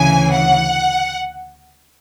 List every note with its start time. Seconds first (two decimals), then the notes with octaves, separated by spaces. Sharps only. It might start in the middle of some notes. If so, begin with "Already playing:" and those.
Already playing: D2 C#3 E3 G#5
0.33 F#5